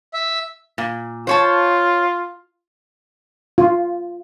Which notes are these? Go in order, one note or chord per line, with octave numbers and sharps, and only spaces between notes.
E5
A#2
F4 C5 C#5 A5
F4